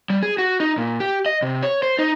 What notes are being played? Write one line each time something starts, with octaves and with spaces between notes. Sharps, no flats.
G3
G#4
F#4
D#4
A#2
G4
D#5
C3
C#5
C5
D#4